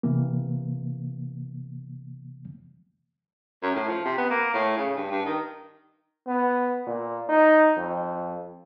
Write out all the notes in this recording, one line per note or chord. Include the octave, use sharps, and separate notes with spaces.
C3 E3 A#3
F#2
A2
F3
C3
B3
A#3
A2
C#3
G2
G2
D#3
B3
A#2
D#4
F2